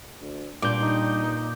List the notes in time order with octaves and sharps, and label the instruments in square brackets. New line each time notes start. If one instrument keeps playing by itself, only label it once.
[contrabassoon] D2
[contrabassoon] G2 [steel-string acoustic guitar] A#2 [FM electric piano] D6 G6
[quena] D#4